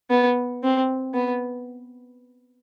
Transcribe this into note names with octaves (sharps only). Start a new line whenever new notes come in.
B3
C4
B3